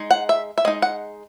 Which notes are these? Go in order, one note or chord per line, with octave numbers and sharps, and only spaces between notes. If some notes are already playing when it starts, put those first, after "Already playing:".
Already playing: G#3 D#4
F#5
E5
E5
G#3 D#4 D#5
F#5